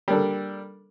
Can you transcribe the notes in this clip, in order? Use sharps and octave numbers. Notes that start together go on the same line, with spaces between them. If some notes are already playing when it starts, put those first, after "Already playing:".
G3 A#3 D4 A4